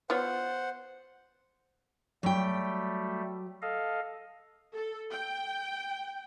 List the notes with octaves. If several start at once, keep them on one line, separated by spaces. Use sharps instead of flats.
B3 F4 C5 C#5 F#5
F#3 G3 A3 G5
A4 D#5 F5
A4
G5